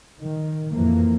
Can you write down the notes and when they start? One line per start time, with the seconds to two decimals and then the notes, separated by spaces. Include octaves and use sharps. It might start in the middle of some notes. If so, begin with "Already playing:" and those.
0.22 D#3
0.72 F2 E3 F3 A#3